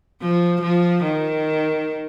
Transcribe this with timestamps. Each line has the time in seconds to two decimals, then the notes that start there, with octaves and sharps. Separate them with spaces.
0.21 F3
0.62 F3
1.04 D#3